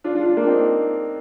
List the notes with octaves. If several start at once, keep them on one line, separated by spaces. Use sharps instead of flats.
D4 F4
D4 F4
D4 F4
A#3 D4
C4 D#4